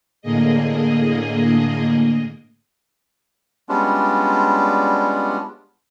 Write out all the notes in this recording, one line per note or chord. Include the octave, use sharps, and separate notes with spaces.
A2 D3 A#3 G#4 D#5
G3 G#3 B3 C#4 D4 F4